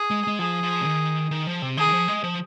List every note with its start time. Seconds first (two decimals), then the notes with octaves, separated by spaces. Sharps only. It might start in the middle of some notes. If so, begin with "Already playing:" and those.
Already playing: G#4
0.11 G#3
0.27 G#3
0.39 F3 G#4
0.63 F3
0.81 C3
0.85 D#3
1.31 D#3
1.47 F3
1.62 C3
1.77 D#3 G#4
1.89 D#3
1.93 F3
2.08 G#3
2.24 F3